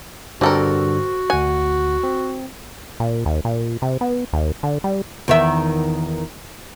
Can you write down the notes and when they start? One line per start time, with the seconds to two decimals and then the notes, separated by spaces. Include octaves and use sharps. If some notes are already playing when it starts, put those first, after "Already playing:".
0.41 G2 D3 G3 C4 F#4 A4 A#4
1.30 D2 F#5 G#5
2.04 C4
3.00 A#2
3.26 D#2
3.45 A#2
3.82 C3
4.01 B3
4.33 D#2
4.63 D3
4.84 G3
5.28 E2 D#3 E5